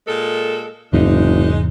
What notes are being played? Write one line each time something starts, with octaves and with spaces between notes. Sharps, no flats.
A#2 G#3 A4
F#1 E2 G#2 C3 G#3 D4 D#4